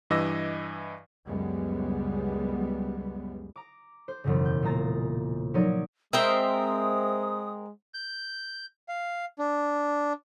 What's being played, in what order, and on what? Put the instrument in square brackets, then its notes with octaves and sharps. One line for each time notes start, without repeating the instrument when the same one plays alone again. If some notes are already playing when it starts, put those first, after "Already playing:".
[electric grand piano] G2 E3 D#5 D6 E6 A#6
[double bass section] C#2 F#2 G3 G#3 B3
[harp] A#5 D6
C5
E1 F#2 C#3
G6
A#2 G#3 A#3 A#5 A6
F3 F#3 D#4 A#4 C#5 D5
[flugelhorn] G#3 [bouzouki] C4 A#4 C5 [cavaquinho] D#5 E5 [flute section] D#6
[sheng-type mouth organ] G6
F5
D4